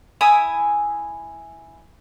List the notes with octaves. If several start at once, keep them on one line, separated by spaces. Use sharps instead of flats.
E4 G#5 B5 D#6